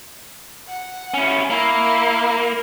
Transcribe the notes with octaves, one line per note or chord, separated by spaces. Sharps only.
F#5
C#4 E4
A#3 E4